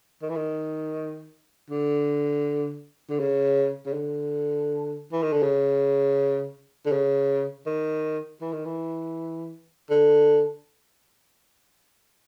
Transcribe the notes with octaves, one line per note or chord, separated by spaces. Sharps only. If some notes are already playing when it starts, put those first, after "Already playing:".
D#3
E3
D#3
D3
D3
C#3
C#3
D3
E3
D#3
D3
C#3
D3
C#3
D#3
E3
D#3
E3
D3